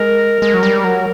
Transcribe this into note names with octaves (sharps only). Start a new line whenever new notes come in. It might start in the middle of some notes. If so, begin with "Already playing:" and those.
Already playing: G#3 A#4
G#3
F#3
G3
F#3